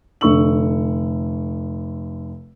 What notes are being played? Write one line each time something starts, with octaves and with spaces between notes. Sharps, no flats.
F1 D3 C#6 E6 F#7